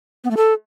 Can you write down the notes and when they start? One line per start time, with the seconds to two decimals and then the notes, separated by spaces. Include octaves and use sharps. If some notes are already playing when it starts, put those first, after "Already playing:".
0.24 B3
0.31 A3
0.37 A4